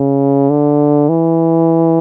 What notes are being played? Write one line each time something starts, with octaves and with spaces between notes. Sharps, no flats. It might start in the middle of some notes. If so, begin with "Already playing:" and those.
Already playing: C#3
D3
E3